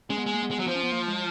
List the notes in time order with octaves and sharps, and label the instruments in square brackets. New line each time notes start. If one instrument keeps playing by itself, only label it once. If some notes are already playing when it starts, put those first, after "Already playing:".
[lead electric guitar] G#3 [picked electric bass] C#4
[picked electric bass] B3
[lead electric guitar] G#3
[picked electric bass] A#3
B3
[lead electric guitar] G#3
F#3
F3
[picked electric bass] C#4
B3
A#3
G#3